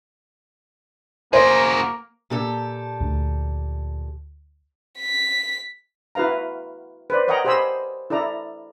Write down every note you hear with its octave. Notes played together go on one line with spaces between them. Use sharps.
A#3 F#4 G#4 A#4 C5
A#2 G4 A4
D2
B6
E4 F#4 B4 F5 A#5
B4 C5 D5
A#4 C#5 D#5 F#5 G5 A#5
G4 C5 D#5 G#5 B5 E6
E4 A4 D5 A#5